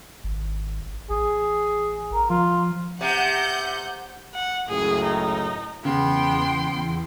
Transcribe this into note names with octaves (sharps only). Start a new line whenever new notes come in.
G#1
A1 G#4
A#4
F3 F4
C3 F#5 G6
F#5
C#2 F#2 A2 G#4
D#4
E2 C#3 B3 G5 C6